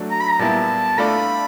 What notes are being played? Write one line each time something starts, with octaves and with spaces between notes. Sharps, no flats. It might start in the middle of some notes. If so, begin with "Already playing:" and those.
Already playing: F#3 A3 D4
A#5
B5
A#5
A#2 G3 B3 E4 A5
A3 D4 F4 A4 D5 B5